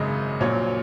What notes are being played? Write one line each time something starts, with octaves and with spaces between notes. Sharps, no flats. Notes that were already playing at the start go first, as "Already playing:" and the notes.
Already playing: G#1 F#2 C#3 G#3 D#5
A#1 A#2 F#3 C#5